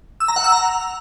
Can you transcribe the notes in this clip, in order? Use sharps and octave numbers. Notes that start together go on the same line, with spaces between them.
E6
A#5
F#5
E6
A#5